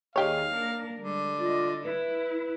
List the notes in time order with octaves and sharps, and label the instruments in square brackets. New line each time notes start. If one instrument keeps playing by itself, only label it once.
[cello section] D#2 D#3 G#4 [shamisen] D#4 G4 C#5 [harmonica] F5
[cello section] A#3 D4 A#4
[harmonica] D3 [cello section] G3 G#3
[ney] F4 [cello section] D5 D#5
[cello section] E4 [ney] B4